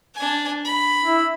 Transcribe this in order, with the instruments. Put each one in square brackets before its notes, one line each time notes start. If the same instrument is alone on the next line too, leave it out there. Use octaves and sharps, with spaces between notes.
[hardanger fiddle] D4 G#5
B5
[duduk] E4